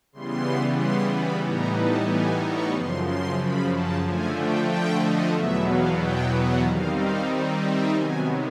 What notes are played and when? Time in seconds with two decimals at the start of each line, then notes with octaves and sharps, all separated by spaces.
0.12 C#3 E3 G3 B3 C6
0.78 C6
1.11 B5
1.43 A2 E3 G3 B3 D#4 A#5
1.76 A5
2.08 G#5
2.41 C#6
2.73 F#2 C#3 F3 C6
3.06 C6
3.39 B5
3.71 A5
4.05 D3 F3 A3 G#5
4.37 G5
4.69 G5
5.01 D#5
5.34 E2 B2 F#3 B3 E5
5.67 F5
6.00 G5
6.32 F#5
6.65 D#3 G3 C4 D#4 F5
6.98 F5
7.63 E5
7.95 C3 D#3 F#3 B3 G#5